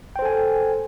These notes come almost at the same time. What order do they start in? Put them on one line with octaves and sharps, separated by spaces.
G5 C5 A4 G#5